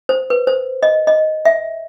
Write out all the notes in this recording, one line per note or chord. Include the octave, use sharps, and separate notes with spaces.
C5
B4
C5
D#5
D#5
E5